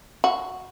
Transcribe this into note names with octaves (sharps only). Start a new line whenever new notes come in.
F#4